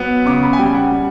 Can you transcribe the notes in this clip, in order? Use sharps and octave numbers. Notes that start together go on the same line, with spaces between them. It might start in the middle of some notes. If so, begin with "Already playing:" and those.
Already playing: F#3 B3
C#3 D6
B5
G#5
G3 G5
F#5
G3